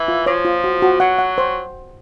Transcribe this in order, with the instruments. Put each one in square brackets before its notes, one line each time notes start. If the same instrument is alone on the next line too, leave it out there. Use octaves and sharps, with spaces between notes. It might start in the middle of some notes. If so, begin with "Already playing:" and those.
Already playing: [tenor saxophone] E3
[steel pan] F4
[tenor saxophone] F3 [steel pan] C#5
[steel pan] F4
F#4
F#4
[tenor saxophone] F#3 [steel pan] F#5
[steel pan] F#5
C5